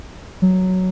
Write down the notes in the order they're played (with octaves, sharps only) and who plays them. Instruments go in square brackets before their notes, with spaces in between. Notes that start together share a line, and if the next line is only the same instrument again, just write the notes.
[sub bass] F#3